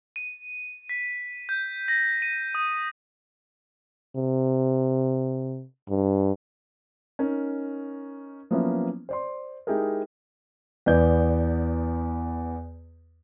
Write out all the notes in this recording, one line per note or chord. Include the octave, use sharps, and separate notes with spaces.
D#7
B6
G6
A#6
D#7
D#6
C3
G2
C#4 D#4 A#4
F3 F#3 A#3 B3 C#4 E4
C5 D5 C6
G#3 D#4 E4 G4 G#4 A#4
E2 B3 D5 G6